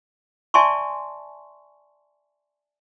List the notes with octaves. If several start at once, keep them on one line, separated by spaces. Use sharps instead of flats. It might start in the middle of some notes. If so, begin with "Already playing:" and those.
D5 E5 G#5 A5 C6 C#6